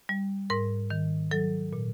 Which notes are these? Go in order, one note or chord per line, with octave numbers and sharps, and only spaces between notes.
G3
G#2 A#4
D#3
F#3 A4
A#2